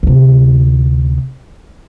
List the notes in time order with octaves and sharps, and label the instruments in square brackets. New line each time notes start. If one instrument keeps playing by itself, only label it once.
[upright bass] D2 C3